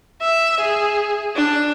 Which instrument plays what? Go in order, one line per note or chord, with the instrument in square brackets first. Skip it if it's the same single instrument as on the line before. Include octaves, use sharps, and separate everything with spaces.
[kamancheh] E5
G#4
D4